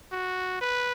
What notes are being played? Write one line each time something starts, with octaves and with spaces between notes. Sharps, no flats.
F#4
B4